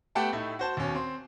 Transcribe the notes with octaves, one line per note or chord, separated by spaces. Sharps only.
A3 B3 G4 F#5 G5 A5
A2 A3 D#4 E4
F#4 C5 A5
D#2 B2 C#4
C4 C6